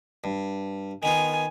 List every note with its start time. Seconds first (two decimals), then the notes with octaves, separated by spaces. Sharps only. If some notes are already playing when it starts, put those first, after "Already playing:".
0.24 G2
1.03 D#3 B3 F4 G#5